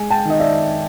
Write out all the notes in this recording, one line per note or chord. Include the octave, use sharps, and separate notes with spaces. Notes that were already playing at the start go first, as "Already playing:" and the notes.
Already playing: G#3 G#5
G5 A5
D#3 D#5
D5 E5